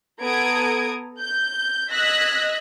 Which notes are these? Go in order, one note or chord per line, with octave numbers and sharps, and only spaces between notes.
B3 A4 A#5 D#6 G#6 D7
G6
D#5 E6 F#6 G#6 A#6 B6